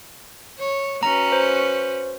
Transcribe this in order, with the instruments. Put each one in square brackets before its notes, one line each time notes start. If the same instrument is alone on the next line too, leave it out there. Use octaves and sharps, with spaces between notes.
[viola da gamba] C#5
[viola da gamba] C#4 F#4 B4 [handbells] A#5
[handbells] C5